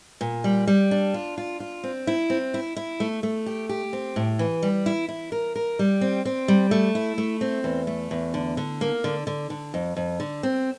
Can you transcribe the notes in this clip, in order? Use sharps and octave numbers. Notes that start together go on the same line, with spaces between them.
A#2
G3
G3
D4
F4
F4
F4
C4
E4
C4
E4
E4
A3
A3
G4
G4
C4
A2
E3
G3
E4
E4
A#4
A#4
G3
C4
C4
G3
A3
E4
A3
C4
E2
A3
E2
D3
D3
A#3
D3
D3
D3
F2
F2
D3
C4